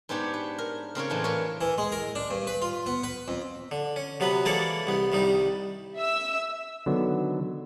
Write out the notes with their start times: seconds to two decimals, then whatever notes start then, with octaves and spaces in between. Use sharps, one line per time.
0.09 G#2 B3 D4 G4 C#5
0.34 B4
0.58 A#4
0.95 C#3 C4 A#4 C#5
1.10 A2 E3 D4 F4
1.24 A#4 B4 C#5
1.61 E3
1.78 G#3
1.92 A#4
2.15 D4
2.30 G2
2.47 B4
2.62 F4
2.86 B3
3.03 B4
3.28 F2
3.71 D3
3.96 C#4
4.20 C3 F#3 B3 B4
4.45 E3 G#3 A#3 A4 C#5 D5
4.87 C2 B3
5.12 C2 D#3 G3 D#4
5.96 E5 E6
6.86 D3 D#3 F#3 B3